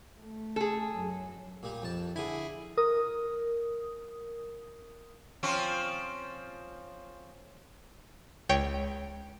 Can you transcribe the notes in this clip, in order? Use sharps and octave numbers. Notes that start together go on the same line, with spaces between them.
A3
G#4 A4
F#2 F#3
A#2 G3
F2 A5
D3 E4 G#4 G#5
A#4 D#6
F3 C4 C#4
C#2 C#5 G5